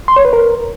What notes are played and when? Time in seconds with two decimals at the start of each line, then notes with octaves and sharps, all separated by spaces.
0.08 C6
0.16 C#5
0.25 B4
0.33 A#4